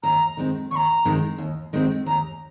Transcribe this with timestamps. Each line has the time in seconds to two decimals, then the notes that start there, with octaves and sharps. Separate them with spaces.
0.03 D#2 A#5
0.37 D#3 G#3 C4
0.71 D#2 A#5 C#6
1.05 D#3 G#3 C4
1.39 D#2
1.73 D#3 G#3 C4
2.06 D#2 A#5